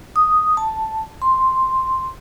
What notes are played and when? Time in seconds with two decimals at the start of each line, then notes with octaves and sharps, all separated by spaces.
0.16 D#6
0.57 A5
1.22 C6